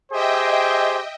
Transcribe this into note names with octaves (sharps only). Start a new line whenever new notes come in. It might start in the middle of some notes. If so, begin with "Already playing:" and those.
G4 G#4 C5 D#5 E5 G5